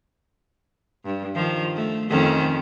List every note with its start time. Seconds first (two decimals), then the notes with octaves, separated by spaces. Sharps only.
1.05 G2
1.35 D#3 F3
1.75 A3
2.09 F2 D#3 C#4